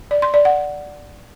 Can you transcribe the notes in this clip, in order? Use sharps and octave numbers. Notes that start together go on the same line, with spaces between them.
D5
C6
D5
F#5